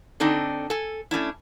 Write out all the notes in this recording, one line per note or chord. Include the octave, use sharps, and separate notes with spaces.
D3 C4 D4 D#4 A4
A4 G#5
A3 C#4 D4 E4